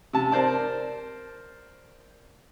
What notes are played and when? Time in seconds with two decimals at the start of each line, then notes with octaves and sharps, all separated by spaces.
0.13 C3 A5
0.31 A#4 C5 D5 A5